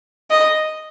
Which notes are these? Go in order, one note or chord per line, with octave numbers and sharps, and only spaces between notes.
D#5